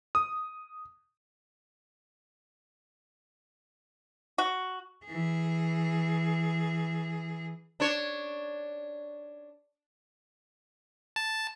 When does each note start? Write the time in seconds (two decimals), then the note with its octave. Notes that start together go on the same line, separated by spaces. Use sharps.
0.15 D#6
4.38 F#4
5.06 E3 G#4
7.80 D4 C#5
11.16 A5